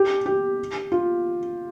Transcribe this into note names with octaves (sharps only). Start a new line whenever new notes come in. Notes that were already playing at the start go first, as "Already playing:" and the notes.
Already playing: G4
G4
F4